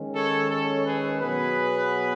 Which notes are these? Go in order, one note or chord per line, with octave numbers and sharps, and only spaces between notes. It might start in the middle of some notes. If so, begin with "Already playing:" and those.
Already playing: D#3 G#3 C#4
A4 C#5
A4 C#5
G#4 B4
B2 F#3 B3 G#4 B4